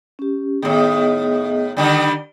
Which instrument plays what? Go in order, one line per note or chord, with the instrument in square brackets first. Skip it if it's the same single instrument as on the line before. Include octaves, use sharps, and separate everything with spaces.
[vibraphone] C#4 G4
[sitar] A2 D#3 [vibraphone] B3 G#4 D#5
[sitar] D3 D#3 G3